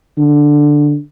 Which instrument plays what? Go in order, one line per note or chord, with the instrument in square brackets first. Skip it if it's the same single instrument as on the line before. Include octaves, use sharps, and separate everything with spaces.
[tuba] D3